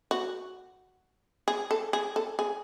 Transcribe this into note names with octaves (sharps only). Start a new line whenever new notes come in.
F#4
G#4
A4
G#4
A4
G#4